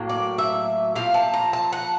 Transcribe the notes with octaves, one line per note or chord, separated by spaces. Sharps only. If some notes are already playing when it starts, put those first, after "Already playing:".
Already playing: A2 F#3 A#3
D5
E5
A#2 F3 F5
A5
A#5
A5
F#5